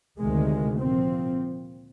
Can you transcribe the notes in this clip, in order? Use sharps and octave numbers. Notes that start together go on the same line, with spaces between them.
D2 C3 D#3 G#3
A#2 F3 C4